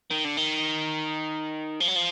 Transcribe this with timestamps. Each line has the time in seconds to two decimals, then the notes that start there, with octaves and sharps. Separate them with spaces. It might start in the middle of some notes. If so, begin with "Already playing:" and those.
0.11 D#3
0.25 D3
0.37 D#3
1.80 F3
1.88 F#3
1.96 F3